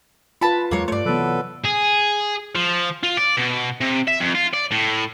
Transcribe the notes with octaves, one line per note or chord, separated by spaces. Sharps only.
F4 B4 A5 B5
E2 F#3 G#3 A#3 C#5
G2 A3 C#5 D5
C3 E3 F#3 B3 A4 B4
G#4
F3
F4
D5
B2
C3
E5
F2
F4
D5
A2